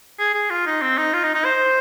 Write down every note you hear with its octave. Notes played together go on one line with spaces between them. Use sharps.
G#4
G#4
F4
D#4
C4
D#4
F4
D#4
D#4
C5